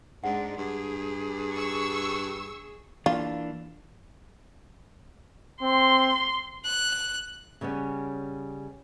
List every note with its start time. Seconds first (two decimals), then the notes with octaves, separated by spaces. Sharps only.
0.24 G#2 G#3 D4 F#5
0.57 G2 G#4
1.55 C#6 E6
3.06 E3 A#3 D4 F4
5.62 C4 C6
6.65 F#6
7.61 C#3 G3 B3 C#4